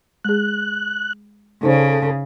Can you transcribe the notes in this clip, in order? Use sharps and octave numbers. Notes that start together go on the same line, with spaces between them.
G#3 G#4 F#6
C#3 D#4 A4 C5 D5